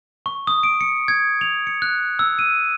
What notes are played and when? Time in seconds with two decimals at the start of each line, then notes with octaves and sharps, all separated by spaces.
0.26 C#6
0.47 D#6
0.63 D7
0.81 C#7
1.08 G#6
1.41 F7
1.67 C#7
1.82 F#6
2.19 E6
2.39 D#7